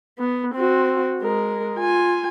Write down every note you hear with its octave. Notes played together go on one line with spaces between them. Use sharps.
B3
C4 F#4
G#3 A#4
F4 G#5